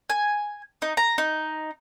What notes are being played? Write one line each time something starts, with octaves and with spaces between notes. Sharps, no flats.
G#5
D#4
A#5
D#4